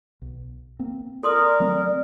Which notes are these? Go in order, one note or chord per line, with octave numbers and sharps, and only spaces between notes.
B1
A#3 C4
A4 A#4 D5 C6 D#6
F#3 A3 C4